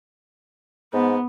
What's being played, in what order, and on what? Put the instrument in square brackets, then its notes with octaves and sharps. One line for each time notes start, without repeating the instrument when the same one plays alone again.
[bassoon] G#2 [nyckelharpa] B3